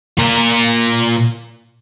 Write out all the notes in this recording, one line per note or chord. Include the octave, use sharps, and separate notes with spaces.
A#2 A#4